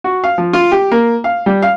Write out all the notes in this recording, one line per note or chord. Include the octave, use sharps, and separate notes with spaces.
F#4
F5
F3
F4
G4
A#3
F5
G3
F5